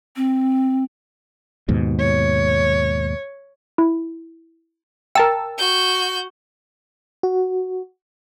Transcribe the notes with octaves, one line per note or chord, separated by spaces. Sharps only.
C4
D#2 G#2 B2
C#5
E4
A#4 G5 A5 E6
F#4 G6
F#4